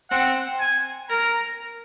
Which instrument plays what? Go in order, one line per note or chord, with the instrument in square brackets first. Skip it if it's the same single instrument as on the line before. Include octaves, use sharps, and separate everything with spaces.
[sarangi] C4 [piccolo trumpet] F#5
[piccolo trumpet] G#5
[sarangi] A#4 [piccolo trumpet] A#5